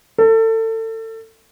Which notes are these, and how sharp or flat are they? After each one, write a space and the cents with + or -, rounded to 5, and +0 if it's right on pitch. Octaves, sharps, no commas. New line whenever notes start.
A4 +30